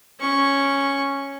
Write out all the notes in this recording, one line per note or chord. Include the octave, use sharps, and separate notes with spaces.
C#4 C#6